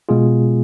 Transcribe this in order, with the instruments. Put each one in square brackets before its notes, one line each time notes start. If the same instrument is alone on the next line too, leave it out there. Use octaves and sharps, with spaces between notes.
[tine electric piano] B2 G#3 B3 F4 G#4